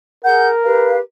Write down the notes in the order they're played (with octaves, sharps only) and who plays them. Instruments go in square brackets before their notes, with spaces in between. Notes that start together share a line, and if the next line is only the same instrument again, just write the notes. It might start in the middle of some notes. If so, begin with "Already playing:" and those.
[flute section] G#4 F#5 G6 [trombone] A#4
[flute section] G4 B4 F5